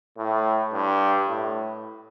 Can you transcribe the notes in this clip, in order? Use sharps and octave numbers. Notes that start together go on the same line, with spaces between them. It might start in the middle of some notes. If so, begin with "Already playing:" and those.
A2
G2
A2